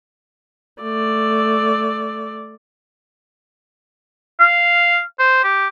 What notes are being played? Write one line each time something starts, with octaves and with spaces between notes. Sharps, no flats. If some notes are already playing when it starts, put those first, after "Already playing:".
A3 D5
F5
C5
G4